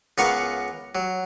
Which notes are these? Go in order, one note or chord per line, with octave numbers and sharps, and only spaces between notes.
C#2 B3 A#4 F5 F#5 C#6
F#3